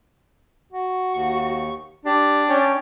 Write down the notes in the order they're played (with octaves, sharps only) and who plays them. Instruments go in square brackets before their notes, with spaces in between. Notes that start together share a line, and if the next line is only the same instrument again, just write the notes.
[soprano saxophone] F#4
[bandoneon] D#2 C#6
[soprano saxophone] D4 [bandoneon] G4
[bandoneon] C#4 C#5 G5